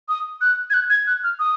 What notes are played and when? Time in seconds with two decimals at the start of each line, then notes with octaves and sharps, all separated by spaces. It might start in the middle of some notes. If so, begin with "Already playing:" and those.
0.09 D#6
0.41 F#6
0.70 G#6
0.74 F#6
0.90 G#6
1.07 F#6
1.24 F6
1.39 D#6